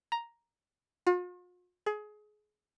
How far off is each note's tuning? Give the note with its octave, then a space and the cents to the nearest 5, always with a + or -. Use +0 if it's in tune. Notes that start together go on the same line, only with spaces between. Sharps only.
A#5 +5
F4 +45
G#4 +25